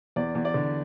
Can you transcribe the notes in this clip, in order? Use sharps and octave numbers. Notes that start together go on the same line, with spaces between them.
E2 D5
E2
D5
D3